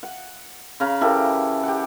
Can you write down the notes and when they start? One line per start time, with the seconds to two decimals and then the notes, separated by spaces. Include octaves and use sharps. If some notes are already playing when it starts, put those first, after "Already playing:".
0.03 F#5
0.80 C#3 F5 A#5 B5
1.01 E3 G4 A4 A#4
1.63 G4 F#5